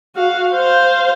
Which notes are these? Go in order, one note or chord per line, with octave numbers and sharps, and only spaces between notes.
F#4 F5
C5 F5